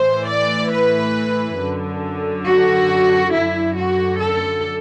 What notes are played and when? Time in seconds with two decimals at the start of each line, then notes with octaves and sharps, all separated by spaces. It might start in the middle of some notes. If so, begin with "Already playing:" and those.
Already playing: A2 E3 C5
0.27 D5
0.71 B4
1.58 F#2 D3
2.46 F#4
3.33 F#2 D3 E4
3.76 F#4
4.20 A4